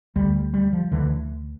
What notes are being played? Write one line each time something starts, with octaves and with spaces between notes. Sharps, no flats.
D2 D3 G3
G3
F3
D2 D3 E3